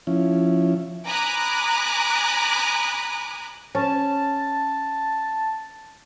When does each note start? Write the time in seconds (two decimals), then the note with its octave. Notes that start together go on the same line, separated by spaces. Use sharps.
0.07 F3 C#4 E4
1.05 G#5 A#5 B5 D6 D#6 F#6
3.75 C#4 A5